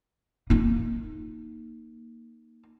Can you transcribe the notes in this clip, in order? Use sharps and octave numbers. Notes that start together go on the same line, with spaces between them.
A#3 D#4